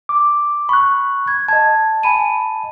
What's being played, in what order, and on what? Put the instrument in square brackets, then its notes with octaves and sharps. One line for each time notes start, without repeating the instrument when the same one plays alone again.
[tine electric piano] D6
[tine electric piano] B5 F#6 [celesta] C#6
[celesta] G#6
[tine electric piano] D#5 A5 [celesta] G#6
[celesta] G#5 B5 D#7